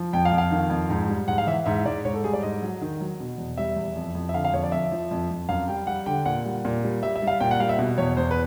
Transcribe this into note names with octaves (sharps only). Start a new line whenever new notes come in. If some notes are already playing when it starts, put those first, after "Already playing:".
Already playing: F3
F2 G5
F5
F2
F5
D#3
F2
G#2
G3
G#2 F#5
F5
E3 E5
G#2 E5
G#2 D5
G#2 C#5
A4
G3 G#4
D5
G#2 D#5
F#3
D#3
F#3
B2
E2
G3 E5
E2
F2
F2
E5
D3 F5
F5
F2 C#5
D5
F2 E5
F3
F2
F2
F#2 F5
G3 G5
G3 F#5
D3 G5
A#2 F#5
G3
A#2
G3
G3 E5
E5
G3
F5
A#2 G5
F#5
G3 F5
E5
B2
E2 C#5
E2 C5
B4